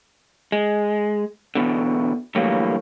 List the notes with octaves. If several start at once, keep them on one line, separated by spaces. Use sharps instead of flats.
G#3
E2 G#2 B2 D3
D2 A2 E3 F#3 G3 A#3